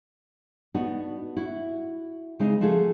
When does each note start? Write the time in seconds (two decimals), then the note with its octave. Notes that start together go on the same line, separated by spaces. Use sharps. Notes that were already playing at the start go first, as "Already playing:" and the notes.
0.74 B3 D4 D#4 F#4
1.37 E4 F#4
2.39 C#3 G#3 C4 D4 D#4
2.61 F3 A3 F4 F#4 G#4